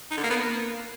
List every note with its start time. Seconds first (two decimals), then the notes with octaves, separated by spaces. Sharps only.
0.11 D#4
0.17 D3
0.24 A#3
0.30 B3
0.36 A#3